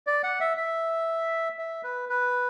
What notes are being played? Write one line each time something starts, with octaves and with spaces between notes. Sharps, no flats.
D5
F#5
E5
E5
E5
B4
B4